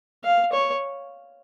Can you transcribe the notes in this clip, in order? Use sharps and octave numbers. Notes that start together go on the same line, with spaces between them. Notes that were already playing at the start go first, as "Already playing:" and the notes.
F5
C#5